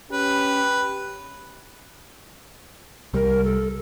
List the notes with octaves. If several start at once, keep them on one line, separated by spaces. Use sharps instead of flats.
C#4 G4 B4
C2 G3 A#4
A4